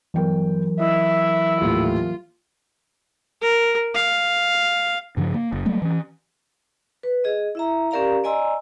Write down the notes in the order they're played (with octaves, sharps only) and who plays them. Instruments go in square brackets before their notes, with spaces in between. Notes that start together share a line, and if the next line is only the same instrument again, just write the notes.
[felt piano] G1 G5 [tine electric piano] E3 F#3 A#4
[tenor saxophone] E4 [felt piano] D#5 [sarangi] E5
[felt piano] D#1 A2 [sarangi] F4
[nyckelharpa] A#4
F5
[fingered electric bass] G2 C#3 F3
A#3
F#1
F#3 G3 A3 A#3
E3 C#4
[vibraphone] B4
G#4 D#5
E4 E5 A#5
C#4 G4 A#4 D5 F5 A#5
D5 D#5 G#5 A#5 C6 E6